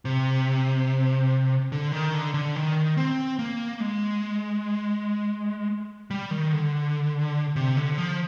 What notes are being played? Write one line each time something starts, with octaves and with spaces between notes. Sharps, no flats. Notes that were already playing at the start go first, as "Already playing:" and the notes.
C3
D3
D#3
D3
D3
D#3
C4
A#3
G#3
G3
D#3
D3
C3
D3
F3